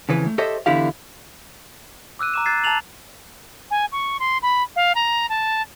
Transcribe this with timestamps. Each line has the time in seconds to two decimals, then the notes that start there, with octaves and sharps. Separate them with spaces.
0.09 F2 C#3 E3 B4
0.26 A3
0.38 G4 A4 C5 C#5 D#5 E5
0.66 E2 D3 E4 G4 F5
2.19 D6 E6 F#6 D#7
2.34 A#5 D6 E7
2.46 F#6 G#6 A6 C7
2.64 A5 A#5 A6 F7 F#7
3.71 G#5
3.92 C#6
4.20 C6
4.42 B5
4.76 F5
4.95 A#5
5.29 A5